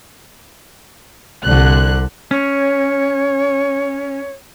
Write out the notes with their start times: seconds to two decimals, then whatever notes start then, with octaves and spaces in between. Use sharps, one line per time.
1.44 C2 D3 F#6
2.31 C#4 C#5